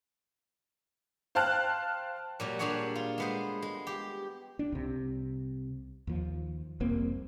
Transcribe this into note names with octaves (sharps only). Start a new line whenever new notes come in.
C5 F5 G5 A5 F6 F#6
A#2 F#3 G3
A#2 G3 D4 G#4 C#5 F#5
F4
G#3 B3 C5
G#3
G4
D4
C2 C3
D#2 F3
F1 C2 A#3 C4